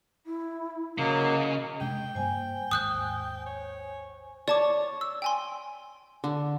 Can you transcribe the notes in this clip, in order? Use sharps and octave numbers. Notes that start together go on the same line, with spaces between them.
E4
C#3 F#3 A#3 D#5
C3 G#3 D4 G5
G2 G3 A#3 C5 G#5
G#1 D#2 G#2 D#6 F#6 G6
C#5
C#5 D5 A5 D6
E6
G5 G#5 C6
D3